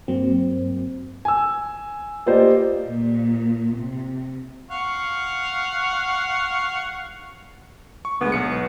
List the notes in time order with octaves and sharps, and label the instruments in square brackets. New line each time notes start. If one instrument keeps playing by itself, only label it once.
[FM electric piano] G2 F#3 A#3 C4
[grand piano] G#5 E6
A#3 F4 G4 C5 D5 D#5
[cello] A#2
C3
[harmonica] F5 F#5 C#6
[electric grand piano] C#6
[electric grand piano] D2 G#3 [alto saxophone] B3
[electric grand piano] B1 C#7